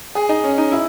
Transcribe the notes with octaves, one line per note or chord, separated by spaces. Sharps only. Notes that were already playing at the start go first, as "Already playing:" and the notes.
G#4
D#4
C#4
D#4
E4